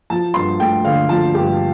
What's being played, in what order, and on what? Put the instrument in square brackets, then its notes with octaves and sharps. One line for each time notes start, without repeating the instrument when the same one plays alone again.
[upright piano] F3 A5
G2 C6
A3 G5
D3 F5
F3 A5
G2 G4